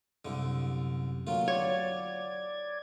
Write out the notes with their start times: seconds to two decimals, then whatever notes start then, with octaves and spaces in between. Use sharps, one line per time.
0.25 C2 F#2 D3
1.27 D3 F#3 A3 A#3 F4
1.48 C#5 D5 G#6